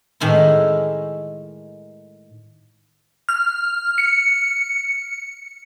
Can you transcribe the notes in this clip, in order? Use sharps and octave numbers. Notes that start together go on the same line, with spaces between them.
A2 D#3 G#3 E4
F6
C#7